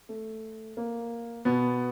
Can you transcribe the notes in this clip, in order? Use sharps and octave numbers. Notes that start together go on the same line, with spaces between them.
A3
A#3
B2 B3